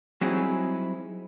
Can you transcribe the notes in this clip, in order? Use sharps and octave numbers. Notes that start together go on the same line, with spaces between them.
F#3 G3 C4 D#4 E4 G#4